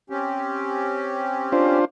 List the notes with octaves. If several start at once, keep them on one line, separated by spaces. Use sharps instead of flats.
C4 C#4 G4
D4 F4 C5